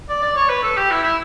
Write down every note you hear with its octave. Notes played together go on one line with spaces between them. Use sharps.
D5
D5
C#5
B4
A4
G4
E4
E4